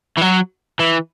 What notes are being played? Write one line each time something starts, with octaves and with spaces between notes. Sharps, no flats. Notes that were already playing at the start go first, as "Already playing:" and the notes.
E3
F#3
E3